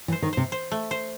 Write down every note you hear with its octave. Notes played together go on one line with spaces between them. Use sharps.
E3
C5
D#3
C3 C5
C5
A3
C5